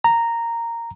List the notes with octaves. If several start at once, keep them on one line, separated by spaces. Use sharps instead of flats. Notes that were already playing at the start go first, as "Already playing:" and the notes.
A#5